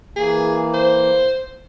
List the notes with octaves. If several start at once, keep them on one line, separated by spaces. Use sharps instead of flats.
E3 A#3 G#4
C5